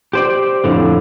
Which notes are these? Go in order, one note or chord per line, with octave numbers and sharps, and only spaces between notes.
G4 C5 D5
F2 A2 D3